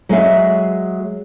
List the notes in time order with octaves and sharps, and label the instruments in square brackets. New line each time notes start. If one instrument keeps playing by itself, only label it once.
[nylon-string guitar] F#3 G#3 G#4 E5